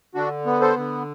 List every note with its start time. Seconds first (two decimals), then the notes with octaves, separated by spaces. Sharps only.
0.15 D3 D4 F#4
0.46 B3
0.61 A4 C5
0.77 D3